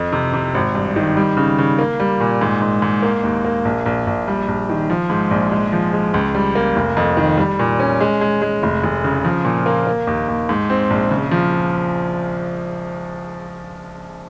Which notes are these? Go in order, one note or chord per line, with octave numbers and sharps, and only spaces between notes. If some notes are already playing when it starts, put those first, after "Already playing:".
Already playing: F2
C3
C3
G#1
G2
D#3
G3
C#3
C#3
A#3
G3
A#2
G#2
G#2
G#2
A#3
D#2
A#3
A#1
A#1
A#1
G3
A#1
D#3
F3
G#2
A#1
G#3
F3
G#3
C#2
G3
A#3
F1
F2
D#3
G3
A#2
C#4
G#3
G#3
G#3
F1
F1
C#3
F3
A#2
A#3
A#3
D#2
D#2
G#2
C4
A#1
C#3
F3